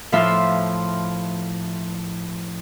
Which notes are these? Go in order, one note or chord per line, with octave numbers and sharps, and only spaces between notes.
A2 F3 F4 E5 C6